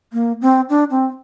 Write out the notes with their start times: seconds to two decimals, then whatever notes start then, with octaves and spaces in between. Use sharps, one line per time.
0.13 A#3
0.41 C4
0.69 D4
0.91 C4